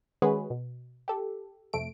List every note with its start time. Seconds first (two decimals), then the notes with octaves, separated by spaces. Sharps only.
0.22 D#3 G#3 C#4 F#4 G#4 B4
0.50 B2
1.08 G4 A4
1.73 C2 F2 A3 D7